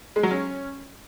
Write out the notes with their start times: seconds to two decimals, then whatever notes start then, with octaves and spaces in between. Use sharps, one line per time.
0.16 G#3
0.23 F#3
0.31 C#4